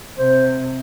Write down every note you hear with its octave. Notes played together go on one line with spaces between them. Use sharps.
C3 C5